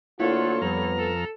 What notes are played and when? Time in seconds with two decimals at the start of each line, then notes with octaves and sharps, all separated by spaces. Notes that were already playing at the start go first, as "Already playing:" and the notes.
0.20 D2 A#3 E4 F4 A4 C#5 F#5
0.62 F2 F3 G3 B3 B4 A#5 F6
0.98 A4